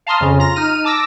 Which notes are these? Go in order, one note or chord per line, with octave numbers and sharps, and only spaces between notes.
F5 A5 A#5 C6 D#6 F6
F2 C#3 C#4
F4 A#5 A#6
D#4 F6 D#7
A5 D6 E6 A#6